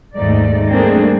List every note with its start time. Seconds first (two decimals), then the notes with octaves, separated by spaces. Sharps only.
0.14 D#2 G#2 A3 D#4 D5
0.70 G3 A3 A#3 C4 D4 G#4